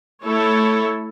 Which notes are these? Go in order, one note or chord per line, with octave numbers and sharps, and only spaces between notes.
A3 E4 A4 C#5